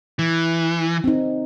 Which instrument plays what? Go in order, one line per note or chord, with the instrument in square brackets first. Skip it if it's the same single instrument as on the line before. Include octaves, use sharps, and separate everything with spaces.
[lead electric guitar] E3
[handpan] C4 D#4